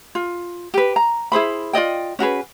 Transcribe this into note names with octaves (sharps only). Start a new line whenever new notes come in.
F4
G4 B4
A#5
E4 G#4 C5 B5
F4 D5 D#5 G5
C#4 F#4 G#4 B4